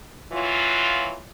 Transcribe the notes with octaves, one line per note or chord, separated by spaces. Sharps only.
E3 F#3 F4